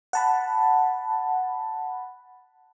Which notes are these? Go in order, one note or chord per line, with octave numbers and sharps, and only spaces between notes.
F#5 A5 B5